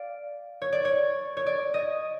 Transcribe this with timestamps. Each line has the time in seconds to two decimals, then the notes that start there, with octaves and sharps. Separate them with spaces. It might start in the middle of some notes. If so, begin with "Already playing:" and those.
Already playing: D5 F5
0.62 C#5
0.72 D5
0.85 C#5
1.37 C#5
1.46 D5
1.74 D#5